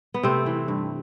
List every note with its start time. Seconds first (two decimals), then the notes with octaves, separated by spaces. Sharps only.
0.14 B3
0.23 C3 A3 C4
0.46 E3
0.68 G2